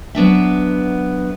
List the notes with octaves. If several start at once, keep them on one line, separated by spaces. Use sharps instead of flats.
F#3 B3 D4 E5